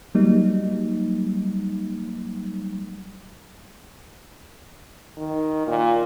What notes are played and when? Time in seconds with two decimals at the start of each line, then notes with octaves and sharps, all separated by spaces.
0.15 F#3 G3 A#3 D#4
5.17 D#3
5.67 A#2